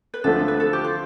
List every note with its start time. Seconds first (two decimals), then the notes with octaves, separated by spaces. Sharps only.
0.14 B4
0.24 D2 D3 F3 A3 A4
0.48 B4
0.60 A4
0.73 G4
0.84 F4